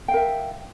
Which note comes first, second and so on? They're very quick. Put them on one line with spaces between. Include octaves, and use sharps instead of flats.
G5 F5 A#4 E5